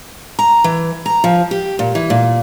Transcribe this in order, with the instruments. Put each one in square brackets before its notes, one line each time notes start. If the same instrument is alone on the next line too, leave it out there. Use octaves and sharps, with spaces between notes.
[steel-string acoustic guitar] A#5
E3
A#5
F3
G4
A#2
E3
A#2